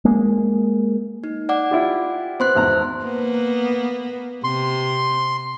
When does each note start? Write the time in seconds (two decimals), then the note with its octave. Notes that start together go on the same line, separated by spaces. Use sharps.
0.05 G#3 A#3
1.24 D#4
1.49 D5 F#5 D6
1.71 E4 F4 G4
2.40 B3 C5 C6 F#6
2.55 G#1 E2 A#5
3.04 A#3 B3
4.44 C3 C6